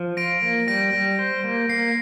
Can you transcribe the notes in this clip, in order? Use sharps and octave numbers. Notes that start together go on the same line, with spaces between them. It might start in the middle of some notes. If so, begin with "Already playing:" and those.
Already playing: F3
F4 A#6 D7
A#3
G3 A#6 D7
G3
C5
A#3
A#3 C7